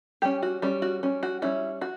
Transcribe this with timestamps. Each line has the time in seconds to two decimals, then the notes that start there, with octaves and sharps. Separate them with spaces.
0.22 G3 C#4 G4
0.43 F#4
0.62 G3 C#4
0.82 F#4
1.03 G3 C#4
1.23 F#4
1.42 G3 C#4 E4
1.81 F#4